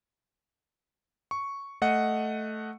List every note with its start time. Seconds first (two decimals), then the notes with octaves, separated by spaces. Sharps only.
1.31 C#6
1.82 A3 D#5 F#5 C#7